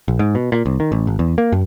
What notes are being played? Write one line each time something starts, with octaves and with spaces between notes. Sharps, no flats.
A#1
G#2
B2
A#2
C2
D#3
A1
G#1
E2
A#3
F#2